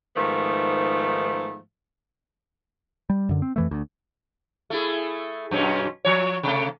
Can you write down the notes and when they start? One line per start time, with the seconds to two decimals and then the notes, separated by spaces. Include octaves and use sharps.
0.15 G#2 D#3 F3 A3 B3
3.10 G3
3.29 F#2 D3
3.42 C4
3.56 F2 E3 A3
3.71 D2
4.70 A3 E4 G#4
5.51 F#2 B2 C#4
6.05 F3 C#5
6.43 C3 A3